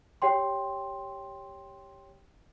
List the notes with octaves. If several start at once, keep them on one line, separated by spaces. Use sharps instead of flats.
G4 C#5 G5 C6